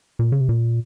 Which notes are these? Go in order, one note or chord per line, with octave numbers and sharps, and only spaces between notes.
A#2
C#3
C3
A#2